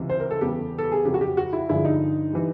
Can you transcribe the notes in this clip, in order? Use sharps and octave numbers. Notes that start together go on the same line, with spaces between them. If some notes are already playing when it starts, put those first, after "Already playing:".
Already playing: C#2 C3 E3 G3
C5
A#4
A4
E2 C#3 E3 G3 G4
A4
G#4
F2 C#3 F#3 G4
F#4
G4
F#4
E4
G2 D3 F3 G#3 E4
D#4
E3 G3